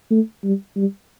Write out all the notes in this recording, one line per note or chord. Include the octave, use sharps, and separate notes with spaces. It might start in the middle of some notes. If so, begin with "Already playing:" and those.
A3
G3
G3